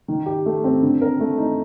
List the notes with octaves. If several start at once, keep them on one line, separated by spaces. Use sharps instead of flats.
D#3
G4
A3
C4
D3
A#4
A3
D#4